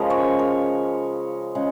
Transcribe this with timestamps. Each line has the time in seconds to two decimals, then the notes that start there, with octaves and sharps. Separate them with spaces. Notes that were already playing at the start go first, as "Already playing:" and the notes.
Already playing: C#3 F3 G#3 A#4
0.10 C#5
0.39 A#4
1.55 C#3 G#3